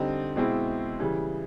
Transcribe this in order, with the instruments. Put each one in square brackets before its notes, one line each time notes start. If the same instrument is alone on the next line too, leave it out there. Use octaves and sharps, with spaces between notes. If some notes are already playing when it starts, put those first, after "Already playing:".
Already playing: [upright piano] D3 G3 C4 D#4
B2 G#3 C4 E4
C#3 E3 G3